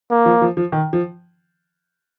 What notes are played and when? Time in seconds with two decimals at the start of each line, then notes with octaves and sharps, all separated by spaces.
0.11 A#3
0.26 F3
0.42 F3
0.57 F3
0.72 D#3
0.93 F3